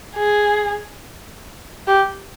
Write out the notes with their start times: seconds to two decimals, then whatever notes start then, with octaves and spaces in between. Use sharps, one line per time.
0.16 G#4
1.88 G4